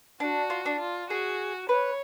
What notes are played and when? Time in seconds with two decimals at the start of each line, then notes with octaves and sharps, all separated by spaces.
0.20 D4 F#4
0.50 F4
0.66 D4
0.80 F4
1.10 F#4 G#4
1.69 B4 C#5